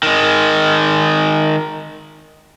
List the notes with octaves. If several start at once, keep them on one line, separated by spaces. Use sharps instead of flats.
D#3 G#3